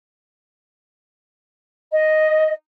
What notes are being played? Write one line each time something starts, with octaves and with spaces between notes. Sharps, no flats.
D#5